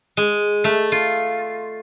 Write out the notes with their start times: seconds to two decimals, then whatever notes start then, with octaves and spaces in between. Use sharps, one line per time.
0.17 G#3
0.64 A3
0.92 F4